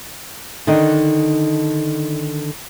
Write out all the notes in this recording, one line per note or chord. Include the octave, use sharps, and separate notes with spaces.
D3 D#3 D4 D#4